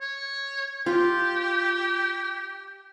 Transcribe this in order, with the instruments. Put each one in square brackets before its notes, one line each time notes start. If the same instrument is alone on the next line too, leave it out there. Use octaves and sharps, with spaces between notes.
[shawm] C#5
[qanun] F4 [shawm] G4